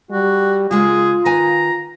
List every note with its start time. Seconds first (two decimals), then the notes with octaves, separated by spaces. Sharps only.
0.11 G3 F#4
0.71 C#3 G#3 A#3 F4 G#4
1.25 D#3 B4 G#5 A#5